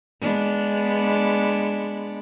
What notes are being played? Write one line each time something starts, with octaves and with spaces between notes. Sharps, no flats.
G#3 B3 D4